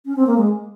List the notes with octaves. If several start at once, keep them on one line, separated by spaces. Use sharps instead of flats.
C#4
C4
A#3
G#3